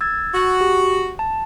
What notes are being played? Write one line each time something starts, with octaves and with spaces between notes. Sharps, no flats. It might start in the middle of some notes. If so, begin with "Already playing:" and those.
E6 G#6 A6
F#4
G4
A5